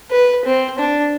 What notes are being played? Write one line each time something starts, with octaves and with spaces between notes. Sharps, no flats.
B4
C4
D4